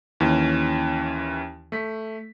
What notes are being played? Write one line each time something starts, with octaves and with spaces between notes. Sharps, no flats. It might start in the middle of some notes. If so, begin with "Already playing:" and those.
D#2 E3 C#4
A3 B6